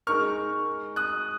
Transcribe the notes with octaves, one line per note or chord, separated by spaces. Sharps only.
G#3 D#4 A#4 C#6 F6
D#6 F#6